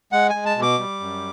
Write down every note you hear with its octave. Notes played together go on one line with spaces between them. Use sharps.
G#3 F#5
G#5
G#3
A5
B2
D6
G3
F#2